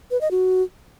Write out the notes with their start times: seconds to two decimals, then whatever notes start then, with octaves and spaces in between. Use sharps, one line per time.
0.11 B4
0.21 D#5
0.31 F#4